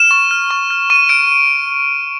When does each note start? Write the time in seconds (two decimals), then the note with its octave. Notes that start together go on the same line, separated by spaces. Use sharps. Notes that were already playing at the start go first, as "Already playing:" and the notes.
Already playing: F6 E7
0.11 C#6
0.31 F6
0.51 C#6
0.70 F6
0.90 C#6 D#7
1.09 F6 D7